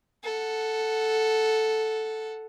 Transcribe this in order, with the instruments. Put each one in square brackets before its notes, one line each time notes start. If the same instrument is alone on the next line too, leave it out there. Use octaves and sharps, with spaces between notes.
[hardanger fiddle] A4 F#5